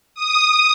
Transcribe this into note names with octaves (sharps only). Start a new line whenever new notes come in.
D#6